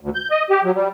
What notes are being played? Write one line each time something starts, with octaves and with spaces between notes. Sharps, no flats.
D2
G6
D#5
G4
F#3
G3